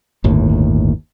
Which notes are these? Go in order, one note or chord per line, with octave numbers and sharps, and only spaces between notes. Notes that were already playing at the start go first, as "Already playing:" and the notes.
G1 D#2 A2